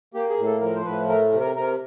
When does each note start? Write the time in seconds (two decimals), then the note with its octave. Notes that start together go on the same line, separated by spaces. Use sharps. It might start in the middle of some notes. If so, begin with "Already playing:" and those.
0.14 A#3 G4
0.30 G#4
0.38 A2
0.46 A4
0.61 F3 A#4
0.75 C5
0.85 A2 B4
1.09 A3 A#4
1.32 C3
1.40 A#4
1.56 C3 A#4